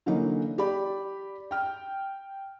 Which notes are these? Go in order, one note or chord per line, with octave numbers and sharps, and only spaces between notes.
D3 E3 F#3 A#3 C#4 D#4
G4 D5 B5
G5 F6